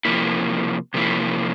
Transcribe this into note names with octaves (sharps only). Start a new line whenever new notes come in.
C3 F3 A#3 E4
C3 F3 A#3 E4